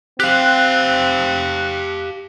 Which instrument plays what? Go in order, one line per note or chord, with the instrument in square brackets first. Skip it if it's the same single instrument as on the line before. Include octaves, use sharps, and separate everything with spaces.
[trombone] C4 [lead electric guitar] G4 F5 [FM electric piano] F#6